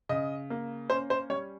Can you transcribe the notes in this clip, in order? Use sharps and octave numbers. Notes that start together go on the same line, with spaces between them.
C#3 D#5
A#3
C#4 C5
C5
G3 C#5